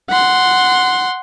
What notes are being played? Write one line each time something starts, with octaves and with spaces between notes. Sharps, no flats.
F#5 C6